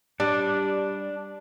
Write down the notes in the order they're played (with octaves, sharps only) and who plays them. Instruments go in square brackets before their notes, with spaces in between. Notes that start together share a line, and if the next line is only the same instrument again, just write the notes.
[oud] G3 [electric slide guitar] D4